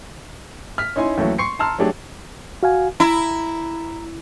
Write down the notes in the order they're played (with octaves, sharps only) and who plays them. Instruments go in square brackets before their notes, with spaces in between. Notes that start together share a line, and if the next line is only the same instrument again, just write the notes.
[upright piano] F6 B6
C#4 D#4 E4 G#5 C6
D#2 E3 F#3 A3 C#4
C6 C#6 C7 C#7
A5 A#5 C6 E6 F6
F#3 A3 D4 G4 G#4
[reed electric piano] F#4 F5 G#5
[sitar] E4 [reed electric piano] A#5